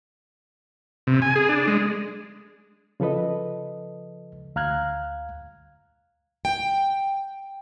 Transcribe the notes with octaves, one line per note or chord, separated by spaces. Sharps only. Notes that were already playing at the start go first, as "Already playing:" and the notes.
C3
G#5
G#4
D4
G#3
C#3 F3 A4 B4 D#5
D2 F5 A#5 F6 F#6 G#6
G5